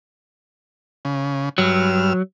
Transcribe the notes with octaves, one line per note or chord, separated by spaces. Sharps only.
C#3
G2 F#3 E6 F6